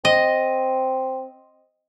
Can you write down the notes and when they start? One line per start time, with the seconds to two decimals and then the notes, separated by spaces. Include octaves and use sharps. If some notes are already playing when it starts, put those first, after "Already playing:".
0.05 C4 D#5